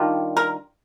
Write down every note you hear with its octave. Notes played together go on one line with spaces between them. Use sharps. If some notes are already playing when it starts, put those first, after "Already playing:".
Already playing: D#3 G3 D4 F4
A#4